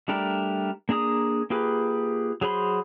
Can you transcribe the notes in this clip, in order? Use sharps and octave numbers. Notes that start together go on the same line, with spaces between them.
G3 A3 D4 G4 A#4
A#3 D4 G#4 A#5 D#6
A#3 F4 G4 G#4 B4
F#3 G#4 C5 B5 C6